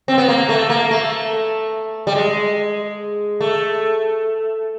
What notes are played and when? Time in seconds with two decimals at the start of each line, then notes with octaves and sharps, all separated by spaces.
0.08 C4
0.18 B3
0.28 A#3
0.49 A3
0.70 A#3
0.91 A3
2.07 G3
2.15 G#3
3.41 A3